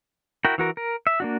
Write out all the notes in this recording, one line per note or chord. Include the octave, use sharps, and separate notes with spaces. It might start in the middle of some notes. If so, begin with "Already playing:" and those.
E4 F#4 A#4 G5
E3 F#4 A#4
A#4
E5
A#3 D4 F#4